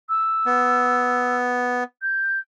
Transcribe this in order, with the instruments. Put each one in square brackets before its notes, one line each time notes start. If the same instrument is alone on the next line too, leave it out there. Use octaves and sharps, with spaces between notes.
[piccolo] E6
[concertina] B3
[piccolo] G6